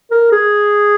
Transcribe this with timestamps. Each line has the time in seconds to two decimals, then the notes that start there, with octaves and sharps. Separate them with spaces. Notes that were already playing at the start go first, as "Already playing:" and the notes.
0.11 A#4
0.32 G#4